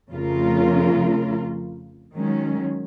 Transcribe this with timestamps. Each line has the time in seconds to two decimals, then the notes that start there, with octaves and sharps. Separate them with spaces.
0.11 F2 C#3 A3 F4 A#4
2.14 D#3 F#3 G#3 C#4